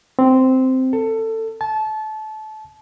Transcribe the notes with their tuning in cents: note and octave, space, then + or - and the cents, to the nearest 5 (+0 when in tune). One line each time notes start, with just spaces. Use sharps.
C4 -10
A4 +20
A5 -25